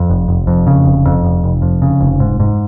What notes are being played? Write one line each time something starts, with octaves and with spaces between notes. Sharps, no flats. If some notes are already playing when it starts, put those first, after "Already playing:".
Already playing: F2
F1
F1
F2
C#3
F1
F2
F1
F1
F2
C#3
F1
G#2
G#2